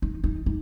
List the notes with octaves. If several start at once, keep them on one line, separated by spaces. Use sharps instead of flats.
D#4
D#4
D#4